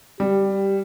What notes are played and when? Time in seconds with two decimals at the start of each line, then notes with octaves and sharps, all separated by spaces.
0.20 G3 G4